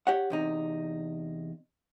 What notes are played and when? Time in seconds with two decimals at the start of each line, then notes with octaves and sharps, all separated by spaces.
0.07 G4 C#5 F#5
0.30 E2 C3 D#4